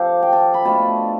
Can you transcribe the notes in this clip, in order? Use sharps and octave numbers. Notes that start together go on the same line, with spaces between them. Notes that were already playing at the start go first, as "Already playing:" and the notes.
Already playing: F3 C4 F4 G4 A4 F5
G5
A5
B5
B2 A3 D4 F4 A5